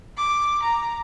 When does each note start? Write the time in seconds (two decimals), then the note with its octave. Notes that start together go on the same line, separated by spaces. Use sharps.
0.17 D6
0.62 A#5